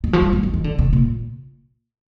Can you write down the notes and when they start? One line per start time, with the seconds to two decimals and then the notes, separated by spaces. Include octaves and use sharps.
0.04 D#3
0.13 F3
0.22 G3
0.33 F3
0.43 D#3
0.54 D#3
0.64 D3
0.79 C3
0.93 A#2